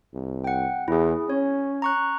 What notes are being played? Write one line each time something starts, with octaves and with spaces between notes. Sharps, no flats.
C2
F#5 G5
E2 E4 G#4
C#4 C#5
A#5 C#6 F#6